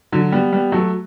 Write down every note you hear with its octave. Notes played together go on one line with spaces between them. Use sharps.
D3 F#3
G3 B3
G3 B3
F#3 A3